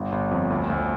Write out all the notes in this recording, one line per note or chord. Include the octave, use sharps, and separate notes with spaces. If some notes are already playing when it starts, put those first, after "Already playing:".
Already playing: G1
G1
F2
D2
D2